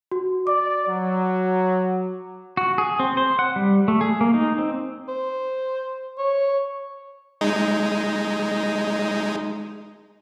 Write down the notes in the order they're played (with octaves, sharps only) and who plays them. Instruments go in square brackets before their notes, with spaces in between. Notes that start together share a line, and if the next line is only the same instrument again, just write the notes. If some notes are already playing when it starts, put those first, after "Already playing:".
[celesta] F#4
[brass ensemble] D5 [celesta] D6
[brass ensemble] F#3
[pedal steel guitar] F#4
G#4
C4
C5
F#5
G3
A3
G#4
A#3
D#4
C4
[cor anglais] C5
C#5
[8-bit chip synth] G#3 D#4